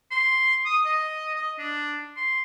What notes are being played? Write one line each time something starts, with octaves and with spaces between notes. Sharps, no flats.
C6
D#6
D#5
D#5
D4
C6